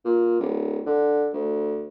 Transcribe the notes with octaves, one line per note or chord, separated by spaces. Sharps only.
A#2
D1
D3
D2